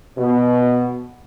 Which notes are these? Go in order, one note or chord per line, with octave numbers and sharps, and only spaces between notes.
B2